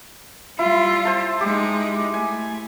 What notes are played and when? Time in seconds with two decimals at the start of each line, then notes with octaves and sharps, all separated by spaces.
0.59 G3 E4 F4
1.05 C5 A5
1.41 G#3 D#4 G4
2.14 A3 G#5